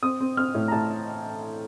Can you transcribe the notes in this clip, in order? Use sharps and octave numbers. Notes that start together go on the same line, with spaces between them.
C4 D#6
C4
C4 F6
A2
A#5
A2 A5